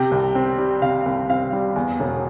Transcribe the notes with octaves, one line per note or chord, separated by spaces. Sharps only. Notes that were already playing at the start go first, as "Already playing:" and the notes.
Already playing: C3 G5
C2
C4
G3
C3 F5
C2
C4 F5
G3
E2
E1